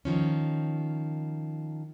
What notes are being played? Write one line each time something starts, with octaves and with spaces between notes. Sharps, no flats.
D#3 F3 C#4